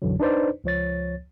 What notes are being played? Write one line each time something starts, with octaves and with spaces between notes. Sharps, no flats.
B1 F#2 D3 E3 F#3
D4 D#4 B4 C5 D5
C#2 F3 C#5 A6